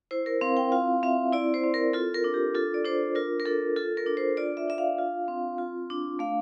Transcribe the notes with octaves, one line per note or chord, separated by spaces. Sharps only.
E4 C5
A#4
C4 F5
G5
F4 F5
C4 E5
E4 D5
C5
C4
A#4
F4 A4
A#4
D4
G4
F4 A4
D5
D4 C5
F4 A#4
A#4
D4 A4
F4 A4
A#4
D4
C5
F4 D5
E5
D4 E5
F5
F4
C4
F4
D4
A3 F5